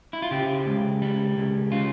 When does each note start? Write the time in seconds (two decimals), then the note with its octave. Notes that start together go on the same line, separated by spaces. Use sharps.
0.13 E4
0.22 F4
0.31 C#3 G4
0.66 C#2
1.02 G3
1.37 C#2
1.72 C#3 F4